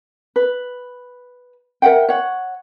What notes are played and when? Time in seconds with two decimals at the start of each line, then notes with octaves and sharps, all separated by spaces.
0.36 B4
1.82 A#4 E5 F#5 G5
2.09 C#5 F#5